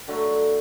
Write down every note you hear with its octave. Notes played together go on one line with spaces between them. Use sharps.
D3 F#3 A3